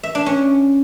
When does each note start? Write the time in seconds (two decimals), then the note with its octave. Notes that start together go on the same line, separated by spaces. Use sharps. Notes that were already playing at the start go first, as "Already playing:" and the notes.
0.03 E5
0.15 D4
0.26 C#4